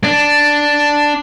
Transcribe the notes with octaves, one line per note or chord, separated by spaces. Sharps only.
D4